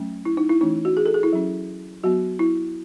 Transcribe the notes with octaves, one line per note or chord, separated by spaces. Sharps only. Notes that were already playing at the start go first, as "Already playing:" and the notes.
Already playing: F#3 A3 C#4
E4
D#4
E4
E3 A3 C#4 D#4
F#4
G#4
A4
G#4
E4
F#3 C#4
F#3 B3 F#4
E4